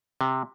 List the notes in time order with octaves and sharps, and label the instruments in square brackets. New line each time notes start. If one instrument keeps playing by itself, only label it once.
[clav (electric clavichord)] C3